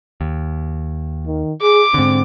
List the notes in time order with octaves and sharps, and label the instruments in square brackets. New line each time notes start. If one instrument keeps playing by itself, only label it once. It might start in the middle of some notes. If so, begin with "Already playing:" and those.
[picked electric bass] D#2
[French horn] D#3
[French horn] G#4 [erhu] D6
[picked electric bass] G#2 D3 [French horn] C4